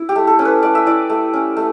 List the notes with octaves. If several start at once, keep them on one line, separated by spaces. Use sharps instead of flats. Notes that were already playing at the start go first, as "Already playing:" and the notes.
Already playing: E4
G4
A3
A4
C#4
B4
A3 D5
E5
E4 D5
A3
C#4
A3